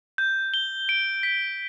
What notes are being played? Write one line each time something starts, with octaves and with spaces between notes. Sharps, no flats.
G6
G7
D7
B6